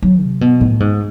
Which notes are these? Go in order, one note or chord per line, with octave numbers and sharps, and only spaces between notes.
F#3
C3
B2
A2
G#2